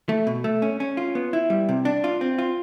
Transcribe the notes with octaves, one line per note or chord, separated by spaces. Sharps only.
A3
B2
A3
C#4
C#4
F4
B3
E4
G3
C3
D4
F4
C4
F4